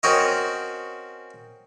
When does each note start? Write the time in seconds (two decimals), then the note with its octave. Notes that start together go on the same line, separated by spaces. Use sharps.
0.03 C4 C#4 F#4 A#4 C#5 D#5